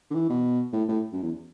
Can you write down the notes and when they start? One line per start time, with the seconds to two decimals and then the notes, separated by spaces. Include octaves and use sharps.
0.11 D3
0.14 E3
0.30 B2
0.73 A2
0.89 A2
1.13 F#2
1.23 E2